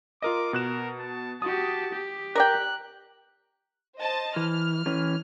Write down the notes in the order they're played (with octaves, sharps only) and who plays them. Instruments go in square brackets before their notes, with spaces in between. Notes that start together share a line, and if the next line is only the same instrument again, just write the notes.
[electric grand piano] F4 A#4 D#5 [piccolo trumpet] D6
[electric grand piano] B2 F#6 E7 [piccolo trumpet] A#4
[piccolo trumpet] A5
[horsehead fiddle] F#4 G4 [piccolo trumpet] A5 [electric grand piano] D#6
[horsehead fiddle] G4
[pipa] A#4 D5 G5 [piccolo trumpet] F#6
[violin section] C5 D#5 A5
[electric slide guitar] E3 [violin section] F6
[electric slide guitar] E3 C#4